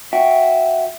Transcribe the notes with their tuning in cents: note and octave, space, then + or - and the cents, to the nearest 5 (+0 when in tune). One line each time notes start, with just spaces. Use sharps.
F#4 +0 E5 +0 G5 +0